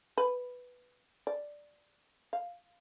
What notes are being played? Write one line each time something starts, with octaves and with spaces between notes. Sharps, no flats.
B4
D5
F5